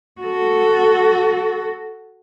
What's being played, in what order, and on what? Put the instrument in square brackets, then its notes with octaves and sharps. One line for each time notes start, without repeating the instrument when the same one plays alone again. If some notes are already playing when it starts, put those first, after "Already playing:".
[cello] F#4 A4